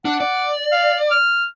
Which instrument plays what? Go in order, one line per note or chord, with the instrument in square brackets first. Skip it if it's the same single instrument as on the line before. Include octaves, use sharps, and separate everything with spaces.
[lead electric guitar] D4 [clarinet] F#5
[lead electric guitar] D5
[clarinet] F5
F6